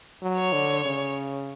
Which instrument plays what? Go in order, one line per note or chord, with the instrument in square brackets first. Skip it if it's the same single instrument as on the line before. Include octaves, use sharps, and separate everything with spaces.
[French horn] F#3
[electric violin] C#5
[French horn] D3
C#3